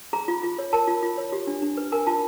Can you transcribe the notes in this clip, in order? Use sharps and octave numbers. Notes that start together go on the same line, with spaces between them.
G#4 A#5
F4
F4
C#5
A#4 A5
F4
F4
C#5
G4
D4
D4
B4
A#4 G#5
F4 A5